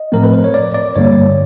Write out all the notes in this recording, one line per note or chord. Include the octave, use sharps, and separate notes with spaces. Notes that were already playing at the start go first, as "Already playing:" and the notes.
Already playing: D#5
A2 F3 A3 C4 A#4
B4
C5
C#5
D5
D5
G2 D3 G3 A#3 C#5